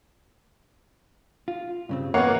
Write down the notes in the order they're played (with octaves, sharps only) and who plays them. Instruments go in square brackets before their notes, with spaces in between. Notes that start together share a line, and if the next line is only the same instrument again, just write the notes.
[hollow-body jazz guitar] F4
G2 C#3 C4
[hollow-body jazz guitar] E2 [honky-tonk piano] A#3 B3 [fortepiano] C#5 F#5